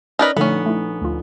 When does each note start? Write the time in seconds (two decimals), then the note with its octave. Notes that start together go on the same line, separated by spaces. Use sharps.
0.19 C#4 D#4 A#4 B4 C#5 D5
0.37 A#1 D3 A3 B3 C#4 D#4 A4
0.66 A3 E4
1.02 D2 F4